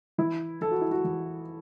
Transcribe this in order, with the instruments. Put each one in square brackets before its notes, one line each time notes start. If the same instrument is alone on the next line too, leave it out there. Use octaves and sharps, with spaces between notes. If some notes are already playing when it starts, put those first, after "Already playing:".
[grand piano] E3 E4
E2 A4
F#4
E4
F#4
E2